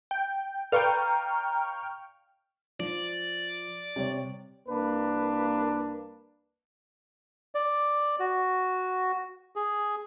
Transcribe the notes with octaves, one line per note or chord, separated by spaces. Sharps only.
G5
B4 D5 F5 G5 A#5 C#6 F6
F3 D5
C3 G3 C#5
C2 A#3 D4 A#4 B4
D5
F#4
G#4